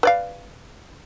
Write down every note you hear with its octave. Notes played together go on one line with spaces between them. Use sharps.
B4 D5 F5